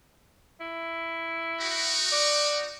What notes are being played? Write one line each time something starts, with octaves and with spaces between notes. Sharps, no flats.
E4
D#4 F#4
D5